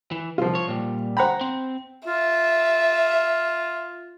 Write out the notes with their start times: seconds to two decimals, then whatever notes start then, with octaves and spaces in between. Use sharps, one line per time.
0.11 E3
0.38 C2 F3 F4
0.55 C#5
0.68 A#2 G3
1.17 C5 F#5 G5 A#5 B5
1.41 C4
2.07 F4 E5